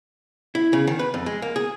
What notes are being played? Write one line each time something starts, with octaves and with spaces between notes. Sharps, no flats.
E4
C#3
D#3
B4
F2
G#3
A#3
G#4